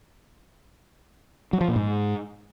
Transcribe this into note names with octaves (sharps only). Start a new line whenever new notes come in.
F#3
F3
A#2
G#2